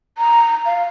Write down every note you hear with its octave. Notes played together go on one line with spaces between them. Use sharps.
A#5
F5